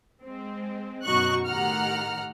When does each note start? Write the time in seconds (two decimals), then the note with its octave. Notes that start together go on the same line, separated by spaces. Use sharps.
0.24 G#3 C4
1.05 F#2 B2 D#4 F#4 C#6 F#6
1.46 A2 D#3 G4 F#5 A#5 F6